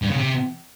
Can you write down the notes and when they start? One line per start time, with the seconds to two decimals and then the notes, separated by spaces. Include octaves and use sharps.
0.02 G2
0.10 C#3
0.18 C3